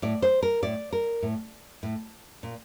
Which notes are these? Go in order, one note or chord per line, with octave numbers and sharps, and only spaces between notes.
A2 D5
C5
A#4
A2 D5
A#4
A2
A2
A#2